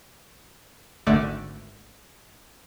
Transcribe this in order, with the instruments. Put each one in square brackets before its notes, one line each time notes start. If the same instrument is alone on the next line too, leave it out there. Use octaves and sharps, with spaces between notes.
[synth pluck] G#1 D3 A3 D5